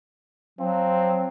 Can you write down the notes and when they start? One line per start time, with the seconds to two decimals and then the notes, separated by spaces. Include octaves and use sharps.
0.59 F3 F#3 C4